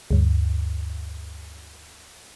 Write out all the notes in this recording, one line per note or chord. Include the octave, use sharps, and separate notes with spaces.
D2 G2